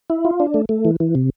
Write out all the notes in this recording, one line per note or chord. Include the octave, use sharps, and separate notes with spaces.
E4
F4
D4
A3
A3
E3
E3
C3